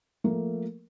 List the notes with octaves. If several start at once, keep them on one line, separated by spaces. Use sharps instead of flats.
F3 A3 A#3 A#4